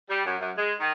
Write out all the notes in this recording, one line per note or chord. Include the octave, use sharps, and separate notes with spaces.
G3
F#2
F#2
G#3
D#3